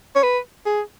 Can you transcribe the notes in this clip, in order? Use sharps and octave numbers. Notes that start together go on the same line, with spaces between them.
C#5
B4
G#4